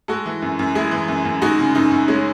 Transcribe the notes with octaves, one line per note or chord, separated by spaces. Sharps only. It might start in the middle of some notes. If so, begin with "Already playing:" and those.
G#3 F#4 A4
E3
F#2
F#2
G#3 E4 G#4
E3
F#2
F#2
G#3 D#4 F#4
C#3
F#2 D#4
F#2
G#3 C#4